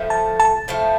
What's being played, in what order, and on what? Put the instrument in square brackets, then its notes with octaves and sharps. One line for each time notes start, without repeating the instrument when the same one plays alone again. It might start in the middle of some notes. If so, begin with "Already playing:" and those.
Already playing: [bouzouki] A2 F3 A3
[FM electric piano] A5
A5
[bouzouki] A2 F3 A3